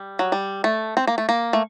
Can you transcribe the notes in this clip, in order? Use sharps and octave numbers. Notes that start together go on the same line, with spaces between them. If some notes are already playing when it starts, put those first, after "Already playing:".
Already playing: G3
F#3
G3
A3
C4
A#3
A3
A#3
A3